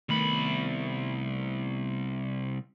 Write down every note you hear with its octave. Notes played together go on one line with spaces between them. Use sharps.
C2 D#3 A3 B3 B5